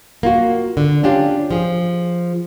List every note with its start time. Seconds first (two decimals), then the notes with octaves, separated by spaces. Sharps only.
0.23 A#3 F4 F#4
0.77 D3
1.03 C#4 D4 F4 G4
1.51 F3 G#4